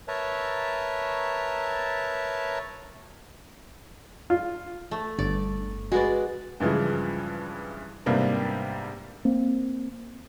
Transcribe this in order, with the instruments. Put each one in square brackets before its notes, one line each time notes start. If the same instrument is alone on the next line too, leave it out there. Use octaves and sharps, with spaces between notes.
[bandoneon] A#4 B4 C#5 E5 A5 A#5
[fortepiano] F4
[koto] A3
[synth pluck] G1 [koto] D5
[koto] G#3 B3 D5 [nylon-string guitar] F#4
[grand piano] G2 C#3 E3 F3 G#3
G#2 C3 G3 A#3 B3 D4
[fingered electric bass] A#3 C4